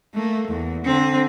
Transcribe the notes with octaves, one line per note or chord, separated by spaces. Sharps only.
A3 A#3
E2
D3 C4